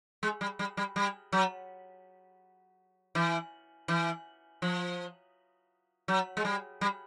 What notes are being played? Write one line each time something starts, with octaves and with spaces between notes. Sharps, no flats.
G#3
G3
G3
G3
G3
F#3
E3
E3
F3
F#3
G#3
G3
G3